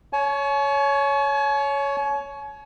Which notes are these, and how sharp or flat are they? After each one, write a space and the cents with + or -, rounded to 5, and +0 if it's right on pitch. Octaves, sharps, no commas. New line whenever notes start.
C#5 +10 G#5 +45